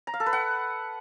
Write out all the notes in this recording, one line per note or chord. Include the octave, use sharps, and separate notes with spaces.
A#5
F5
A4
B4
F#5